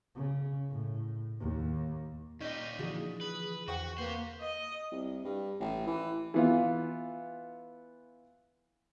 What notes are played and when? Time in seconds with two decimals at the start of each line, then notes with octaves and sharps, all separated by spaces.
0.15 C#3
0.69 A2
1.40 D#2
2.41 A#2 C#4 D#4 G4 D#5 G6 D#7
2.79 D3 E3 F3 F#4 G#4 D5
3.21 B4
3.68 E2 F#4 C5 F#5 G5 C#6
3.98 A#3 G4 B4 C5
4.41 D#5
4.92 C2
5.24 G2
5.60 A1
5.87 E3
6.34 E3 B3 F4